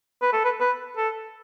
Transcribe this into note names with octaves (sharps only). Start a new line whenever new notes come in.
B4
A4
B4
B4
A4